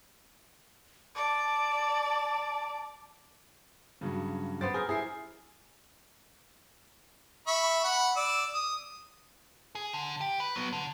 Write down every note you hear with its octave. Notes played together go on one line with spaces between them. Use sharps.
D5 A5
G2 C#3 F#3
B3 C5 D5 A6
G#4 A#4 G6
E4 G#4 C7
E5 B5 C#6
F#5 B5
D5 E6
D#6
G#4
D3
G4
B4
F#3 B3
D3